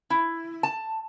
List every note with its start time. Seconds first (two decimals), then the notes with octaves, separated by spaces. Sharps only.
0.10 E4
0.63 A5